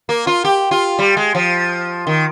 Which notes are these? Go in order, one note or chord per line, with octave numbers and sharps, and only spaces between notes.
A#3
F4
G4
F4
G3
G#3
F3
D#3